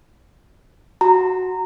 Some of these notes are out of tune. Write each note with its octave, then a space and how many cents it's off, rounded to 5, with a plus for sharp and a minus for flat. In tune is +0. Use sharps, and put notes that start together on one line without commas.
F#4 +0 A#5 -20